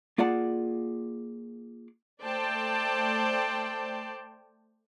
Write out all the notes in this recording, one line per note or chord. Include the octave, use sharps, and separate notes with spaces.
A#3 F4 G#4 D5 F#5 A5
A3 C5 D5 G5 A5